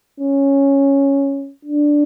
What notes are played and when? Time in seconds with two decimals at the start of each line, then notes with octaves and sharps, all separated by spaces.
0.20 C#4
1.65 D4